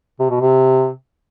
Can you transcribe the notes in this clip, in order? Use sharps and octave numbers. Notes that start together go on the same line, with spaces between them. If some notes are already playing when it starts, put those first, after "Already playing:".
C3
B2
C3